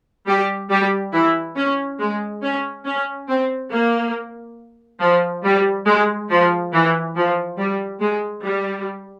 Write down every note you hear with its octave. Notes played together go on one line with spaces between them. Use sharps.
G3 G4
G3 G4
E3 E4
C#4
G#3
C#4
C#4
C4
A#3
F3
G3
G#3
F3
E3
F3
G3
G#3
G3